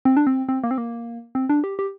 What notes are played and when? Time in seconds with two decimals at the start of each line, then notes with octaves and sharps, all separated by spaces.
0.05 C4
0.17 D4
0.27 C4
0.49 C4
0.64 A#3
0.71 C4
0.78 A#3
1.35 C4
1.49 D4
1.64 G4
1.79 G4